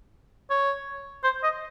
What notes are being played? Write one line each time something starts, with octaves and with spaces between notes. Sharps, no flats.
C#5
C5
D#5